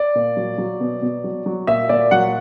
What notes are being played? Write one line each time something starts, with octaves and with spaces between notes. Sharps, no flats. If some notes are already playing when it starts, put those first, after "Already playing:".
Already playing: D5
A#2
F#3
F#3
B2
B2
F#3
F#3
A#2 E5
A#2 D5
F#3 F#5